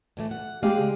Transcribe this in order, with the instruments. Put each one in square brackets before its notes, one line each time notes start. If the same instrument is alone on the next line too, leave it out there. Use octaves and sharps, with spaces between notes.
[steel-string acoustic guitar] A2 E3 A3
F#5
[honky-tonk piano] G#3 [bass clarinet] G4 [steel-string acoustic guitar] G#4 D5 F5
[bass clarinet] C#3